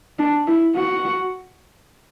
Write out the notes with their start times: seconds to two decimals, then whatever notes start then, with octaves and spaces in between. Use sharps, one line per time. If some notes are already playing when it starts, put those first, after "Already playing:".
0.19 D4
0.47 E4
0.76 F#4